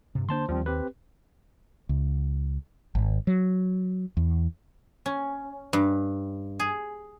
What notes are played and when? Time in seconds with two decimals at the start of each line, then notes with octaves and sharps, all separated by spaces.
0.15 G2 C3
0.29 D3 A#3 D4 C5 A5 C6
0.49 D#2 F3 G3 C4
0.66 C4 G4 B4
1.89 C#2
2.95 G#1
3.27 F#3
4.17 E2
5.06 C#4
5.73 G2
6.60 G#4